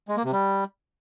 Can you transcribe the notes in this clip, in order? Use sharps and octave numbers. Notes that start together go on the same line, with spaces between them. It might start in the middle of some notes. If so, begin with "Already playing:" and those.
G#3
A#3
C3
G3